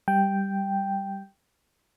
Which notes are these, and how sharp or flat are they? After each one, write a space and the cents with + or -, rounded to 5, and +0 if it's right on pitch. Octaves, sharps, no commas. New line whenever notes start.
G3 +0 G5 +0